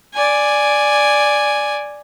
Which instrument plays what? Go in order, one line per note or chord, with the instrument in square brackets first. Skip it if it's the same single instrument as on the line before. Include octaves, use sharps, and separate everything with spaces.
[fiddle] D5 G#5